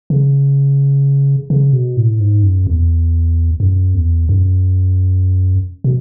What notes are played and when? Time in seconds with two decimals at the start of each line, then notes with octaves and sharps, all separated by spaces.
0.10 C#3
1.50 C#3
1.73 B2
1.97 A2
2.20 G#2
2.43 F#2
2.67 E2
3.60 F#2
3.94 E2
4.29 F#2
5.84 B2